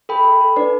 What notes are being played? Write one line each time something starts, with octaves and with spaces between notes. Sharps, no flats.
A4 G5 B5
A4
A4
D4 B4 D5